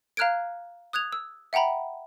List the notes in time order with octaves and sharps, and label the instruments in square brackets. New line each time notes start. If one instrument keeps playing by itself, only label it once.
[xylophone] F5 A#5 F6 F#6 G#6 D7
D#6 F#6 G#6 F7
E6
E5 F#5 G5 A#5 B5